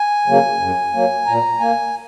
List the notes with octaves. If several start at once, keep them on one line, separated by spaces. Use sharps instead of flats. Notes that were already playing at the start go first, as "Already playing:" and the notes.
Already playing: G#5
C#3 F#3 A#3
F#2
F#3 A#3
A#2 A#5
A#3 G#5